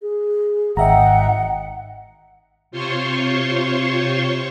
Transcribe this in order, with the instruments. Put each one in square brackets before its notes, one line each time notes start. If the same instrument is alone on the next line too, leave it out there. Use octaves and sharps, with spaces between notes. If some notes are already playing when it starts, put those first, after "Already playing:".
[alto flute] G#4
[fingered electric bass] G#1 [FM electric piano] D#5 E5 A#5 [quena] F#5 [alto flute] G5
[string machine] C3 F4 C5 C#5 C6 C#6